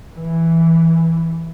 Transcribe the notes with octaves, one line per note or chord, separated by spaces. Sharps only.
E3